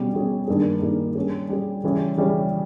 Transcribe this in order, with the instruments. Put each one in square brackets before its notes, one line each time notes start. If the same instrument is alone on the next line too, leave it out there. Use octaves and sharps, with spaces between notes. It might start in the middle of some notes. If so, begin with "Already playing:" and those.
Already playing: [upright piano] B2 G3 C#4 G#4
B2 G3 C#4 G#4
G2 D#3 A#3 D#4 G#4
G2 D#3 A#3 D#4 G#4
G3 C#4 G#4
G3 C#4 G#4
C#3 E3 G3 C#4 G#4
C#3 E3 G3 C#4 G#4